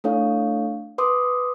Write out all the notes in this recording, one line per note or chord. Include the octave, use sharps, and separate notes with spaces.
A3 D4 E4 A4 C#5 F5
B4 C6 D6 D#6